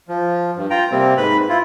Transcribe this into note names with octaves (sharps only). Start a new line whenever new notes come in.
F3
G2
F4 G5 A#5
C3 G3 A#3 C4
G#2 B4 B5
E4 F4